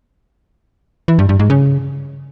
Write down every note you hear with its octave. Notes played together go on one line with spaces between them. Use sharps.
E3
G2
G2
G#2
C#3